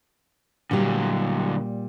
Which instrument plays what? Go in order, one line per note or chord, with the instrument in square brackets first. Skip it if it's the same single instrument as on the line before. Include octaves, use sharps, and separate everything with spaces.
[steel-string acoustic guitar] A#2 G3 [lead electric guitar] D3 F#3